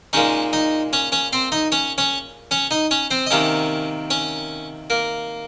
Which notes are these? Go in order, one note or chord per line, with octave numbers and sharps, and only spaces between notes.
A#2 G#3 C#4 D#4 C#5
D#4 D#5
C#4 C#5
C#4 C#5
C4 C5
D#4 D#5
C#4 C#5
C#4 C#5
C#4 C#5
D#4 D#5
C#4 C#5
C4 C5
D#5
C3 D#3 A#3 C#4 C#5
C#4 C#5
A#3 A#4